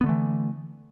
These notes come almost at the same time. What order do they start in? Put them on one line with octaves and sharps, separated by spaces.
B3 D3 A3 E3